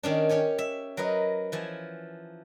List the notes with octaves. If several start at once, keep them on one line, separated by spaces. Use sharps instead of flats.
D#3 C#4 D4
C#4 G4 C#5 G#5
E5
F#3 A#4 B4 D#5
E3 F3 G#5